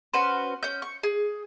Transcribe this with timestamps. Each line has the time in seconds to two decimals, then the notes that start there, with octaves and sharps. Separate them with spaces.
0.14 C#4 F#4 B4 C5
0.63 C#4 G6
0.82 C#6
1.03 G#4